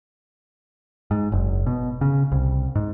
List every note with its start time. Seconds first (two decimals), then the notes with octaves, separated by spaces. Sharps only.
1.11 G#2
1.32 F#1
1.66 B2
2.01 C#3
2.32 C2
2.75 G#2